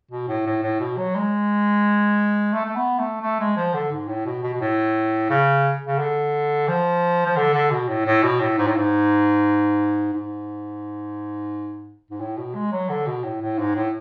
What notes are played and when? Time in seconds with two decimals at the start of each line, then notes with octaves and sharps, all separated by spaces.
0.11 B2
0.28 A2
0.46 A2
0.63 A2
0.80 B2
0.98 F#3
1.15 G#3
2.53 A3
2.65 A3
2.76 B3
2.99 A3
3.22 A3
3.40 G#3
3.56 F3
3.74 D3
3.92 G#2
4.09 A2
4.25 B2
4.43 B2
4.54 B2
4.60 A2
5.30 C#3
5.87 C#3
5.99 D3
6.68 F3
7.26 F3
7.36 D3
7.54 D3
7.71 B2
7.88 A2
8.05 A2
8.23 B2
8.40 A2
8.57 G#2
8.67 A2
8.77 G#2
10.13 G#2
12.10 G#2
12.20 A2
12.37 B2
12.55 G#3
12.72 F#3
12.89 D3
13.07 B2
13.24 A2
13.41 A2
13.59 G#2
13.75 A2